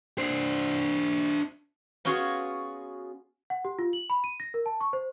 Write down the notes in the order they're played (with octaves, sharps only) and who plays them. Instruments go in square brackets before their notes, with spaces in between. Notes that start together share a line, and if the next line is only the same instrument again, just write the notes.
[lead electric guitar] D4 C5
[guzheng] B3 C#4 F4 F#4 G#4
[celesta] F#5
G4
F4
F#7
B5
D#7
A#6
A#4
A5
C#6
C5